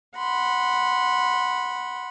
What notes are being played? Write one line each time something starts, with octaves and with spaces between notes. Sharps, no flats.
F#5 B5 C6